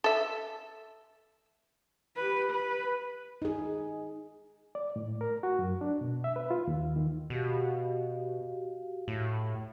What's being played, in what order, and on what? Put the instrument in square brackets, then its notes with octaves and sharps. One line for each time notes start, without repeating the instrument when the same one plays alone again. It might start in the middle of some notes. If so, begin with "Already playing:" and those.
[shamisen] A4 E5
[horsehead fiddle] G4 B4
B4
[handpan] D#4 G#4
[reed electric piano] D5
A2
A#4
F#4
F#2
D4
B2
E5
B4
F4
D#2
D#3
[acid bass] B2 [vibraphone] F#4 G4 F5
[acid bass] A2